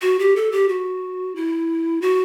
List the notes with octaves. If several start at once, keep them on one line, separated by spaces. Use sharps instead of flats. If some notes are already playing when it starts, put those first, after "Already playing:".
F#4
G4
A4
G4
F#4
E4
F#4